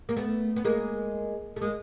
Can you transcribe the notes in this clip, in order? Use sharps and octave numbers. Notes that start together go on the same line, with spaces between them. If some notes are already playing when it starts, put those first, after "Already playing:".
A#3
A3 B3
B3
G#3 A#3
A3
G#3 A#3